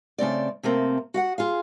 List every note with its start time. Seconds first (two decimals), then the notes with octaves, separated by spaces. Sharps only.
0.18 C#3 A3 C4 D5
0.63 C3 A3 A#3 C4
1.14 F#4 F5 F#5
1.38 F4 G#4 F5